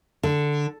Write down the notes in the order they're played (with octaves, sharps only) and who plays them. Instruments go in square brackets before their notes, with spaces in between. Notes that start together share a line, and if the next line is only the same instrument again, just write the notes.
[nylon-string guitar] D3